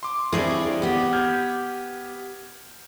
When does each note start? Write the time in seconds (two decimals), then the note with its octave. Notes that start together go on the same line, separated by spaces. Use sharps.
0.03 C6 D6
0.33 G2 C4 E4 G#4 C#5 D5
0.82 B3 G4
1.13 F6 G6 G#6